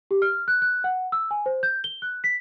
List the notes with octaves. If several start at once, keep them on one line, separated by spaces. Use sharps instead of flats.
G4
F6
F#6
F#6
F#5
E6
G#5
C5
G6
G7
F#6
B6